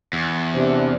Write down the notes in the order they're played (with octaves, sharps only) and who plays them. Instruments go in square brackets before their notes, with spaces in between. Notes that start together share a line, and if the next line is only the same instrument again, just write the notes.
[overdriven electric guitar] E2
[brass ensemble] C3 D4